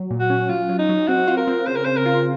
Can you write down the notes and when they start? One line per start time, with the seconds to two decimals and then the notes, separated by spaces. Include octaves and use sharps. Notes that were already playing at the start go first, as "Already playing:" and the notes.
Already playing: F#3
0.10 A#2
0.20 F#4
0.30 C#4
0.49 F#3 F4
0.69 F#3
0.79 D#4
0.89 F#3
1.08 C4 F#4
1.27 F4
1.37 A#4
1.47 C4
1.67 C#3 C5
1.75 A#4
1.85 C#3 C5
1.97 A#4
2.06 F4